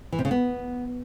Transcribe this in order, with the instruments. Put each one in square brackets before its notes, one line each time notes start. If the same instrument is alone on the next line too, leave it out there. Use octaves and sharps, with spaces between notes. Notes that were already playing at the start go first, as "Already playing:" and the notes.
[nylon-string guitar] E3
C3
C#3
B3